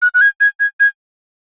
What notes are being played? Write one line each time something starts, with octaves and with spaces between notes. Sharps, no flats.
F#6
F#6
G#6
G#6
G#6
G#6